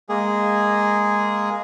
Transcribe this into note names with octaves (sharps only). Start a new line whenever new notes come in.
G#3 A#3 G#4